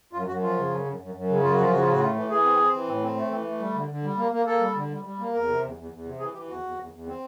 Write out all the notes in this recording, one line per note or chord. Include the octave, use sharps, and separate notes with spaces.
F#2 F4
F#2 F#4
F3 F4
C#3
F#2
F#2
F#2
F#2
C#3
F#2 F4
F#4
F3 F4
C#3 F#4
F4
A2 F#4
A3 F4
E3
E3 G#4
C4
C4
E3
A2
C4
A3
E3
A3
G3
D3
D3
G3
A#3
A#3
A#3 A4
G3
D3
G3
G3
A#3
E2 A#4
C3
E2
E2
E2
C3
E3 G#4
E3 G4
E2 F#4
E2
E2
E2
C4